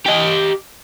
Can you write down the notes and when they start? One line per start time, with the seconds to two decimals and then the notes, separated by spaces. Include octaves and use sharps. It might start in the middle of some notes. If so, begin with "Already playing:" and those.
0.06 G4 D#5